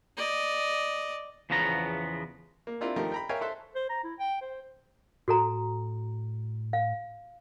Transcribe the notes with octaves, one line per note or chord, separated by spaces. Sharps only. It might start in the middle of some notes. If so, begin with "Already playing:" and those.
D5 D#5
E2 C#3 F3 B3 A#5
A#3
C4 D4 E4 F4 A#4
D#3 F3 A3 G4 A#4
G5 A#5 B5
A#4 C#5 E5 F5 G5 G#5
A4 C5 E5 F#6
C5
A#5
E4
G5
C5
A2 F#4 A4 A#5
F5